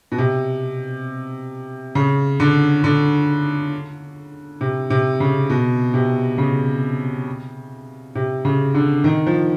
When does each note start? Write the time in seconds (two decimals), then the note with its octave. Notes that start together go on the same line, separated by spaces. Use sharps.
0.12 B2
0.18 C3
1.95 C#3
2.40 D3
2.84 D3
4.61 C3
4.90 C3
5.20 C#3
5.50 B2
5.94 C3
6.38 C#3
8.15 C3
8.45 C#3
8.74 D3
9.04 D#3
9.27 F3